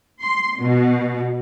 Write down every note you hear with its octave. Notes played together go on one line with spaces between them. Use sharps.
C6
B2